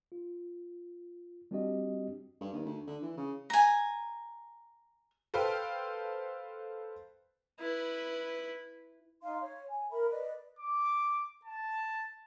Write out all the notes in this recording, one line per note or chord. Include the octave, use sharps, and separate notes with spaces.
F4
G3 C4 D4 F#4 G4 D#5
G2
D#2
D2
D3
E3
C#3
G#5 A#5
A4 B4 C5 F5 G5
E4 B4
D#4 F5 C6
C#5
G#5
A#4 E5 B5
B4 D5 D#5
D6
A5